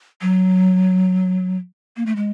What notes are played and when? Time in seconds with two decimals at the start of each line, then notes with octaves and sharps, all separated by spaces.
0.21 F#3
1.97 A#3
2.06 A3
2.16 G#3